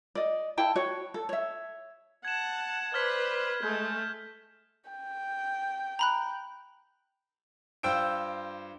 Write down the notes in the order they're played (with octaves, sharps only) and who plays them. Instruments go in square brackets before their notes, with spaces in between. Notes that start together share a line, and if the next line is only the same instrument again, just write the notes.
[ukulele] D5 D#5
E4 G5 A5
F#4 C#5
A4
C#5 E5
[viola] F#5 A5 [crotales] G#6 E7
[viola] B4 [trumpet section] C5 D5 [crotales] F6 G#6 B6
[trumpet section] G#3 [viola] A3 [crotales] G6
[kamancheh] G5
[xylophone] A#5 B5 F#6
[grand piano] G2 F4 C5 G5 E6 D7